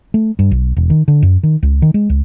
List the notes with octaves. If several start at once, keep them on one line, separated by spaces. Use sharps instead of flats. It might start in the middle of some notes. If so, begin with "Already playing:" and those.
A3
G2
B1
E1
D#3
D3
F#2
D#3
C#2
D#3
G#3
C#2